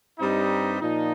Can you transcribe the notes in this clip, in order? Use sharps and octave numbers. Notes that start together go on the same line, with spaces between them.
G2 G3 C4 D#4
A#2 F3 D#4